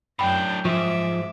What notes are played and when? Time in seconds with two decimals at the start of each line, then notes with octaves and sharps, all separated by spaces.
0.19 F#2 A2 D4 G5 B5 G6
0.65 G#2 F3 E5 C#6 D6